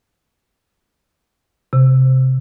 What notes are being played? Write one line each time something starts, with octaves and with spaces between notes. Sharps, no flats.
C3